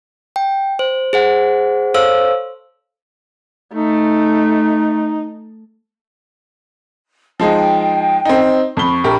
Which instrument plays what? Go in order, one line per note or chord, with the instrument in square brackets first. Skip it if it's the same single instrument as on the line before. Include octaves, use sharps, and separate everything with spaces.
[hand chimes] G5
C5
G#4 C5 F#5
A4 C5 C#5 F5 E6
[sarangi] A3 [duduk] D#4
[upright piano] F3 G#3 D#4 [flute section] G5
[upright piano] C4 D#4
[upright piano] F2 G7 [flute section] B5 C#6
[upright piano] A#1 G4 A#4